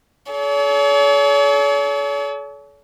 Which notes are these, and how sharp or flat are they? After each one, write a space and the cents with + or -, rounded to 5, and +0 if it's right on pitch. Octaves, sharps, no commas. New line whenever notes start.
A4 -45 C#5 +40